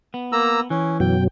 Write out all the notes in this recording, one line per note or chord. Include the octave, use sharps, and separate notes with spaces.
B3
A#3 A#5 E6
E3 C#4
F#2 B2 F#3 G5